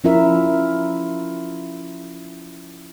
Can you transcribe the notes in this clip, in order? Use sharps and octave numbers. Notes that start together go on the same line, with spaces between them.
F3 C#4 E4 F4 A#4 E5